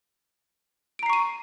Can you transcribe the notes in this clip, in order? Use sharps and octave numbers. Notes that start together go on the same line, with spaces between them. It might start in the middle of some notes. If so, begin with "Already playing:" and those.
A#5 C#6 C7 D7 D#7